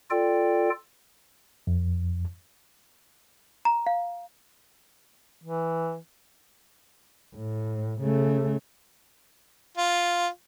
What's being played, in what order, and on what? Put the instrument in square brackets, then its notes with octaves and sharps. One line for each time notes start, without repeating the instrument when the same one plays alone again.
[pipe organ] F4 A4 D5 G5
[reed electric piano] F2
[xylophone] A#5
F5
[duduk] E3
[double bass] A2
C#3 A3
[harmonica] F4